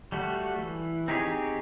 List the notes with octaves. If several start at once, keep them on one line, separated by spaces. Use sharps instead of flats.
G3 A3 F#4
E3
C4 D#4 G4 G#4 C#5